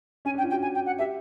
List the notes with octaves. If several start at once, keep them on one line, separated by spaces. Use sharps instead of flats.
C#4 G#5
D4
G5
F4
F#4 G5
G#5
G5
F#5
G4 E5